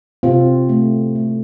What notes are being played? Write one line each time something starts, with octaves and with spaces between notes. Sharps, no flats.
C3 C4 F4
A3
A3